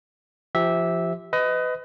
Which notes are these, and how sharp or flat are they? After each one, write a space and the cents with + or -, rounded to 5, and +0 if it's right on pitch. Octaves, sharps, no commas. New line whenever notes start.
F3 -20 G4 +0 E5 -10
B4 +30 D#5 +10